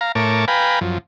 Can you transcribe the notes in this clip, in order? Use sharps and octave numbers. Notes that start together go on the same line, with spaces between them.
F5 A#5
A2 A#4 C#5 A5 D6
B4 F5 G5 G#5 A#5 B5
F#2 F3